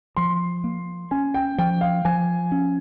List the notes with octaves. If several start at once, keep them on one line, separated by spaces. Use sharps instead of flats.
F3 C6
A#3
C#4 G#5
G5
F3 G5
F5
F3 G#5
C#4